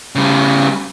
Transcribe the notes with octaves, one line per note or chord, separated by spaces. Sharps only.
C#3 G3